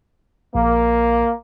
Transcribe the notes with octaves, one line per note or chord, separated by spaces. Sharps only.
A#1 A#3